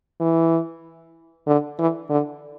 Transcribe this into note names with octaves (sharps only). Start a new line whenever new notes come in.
E3
D3
E3
D3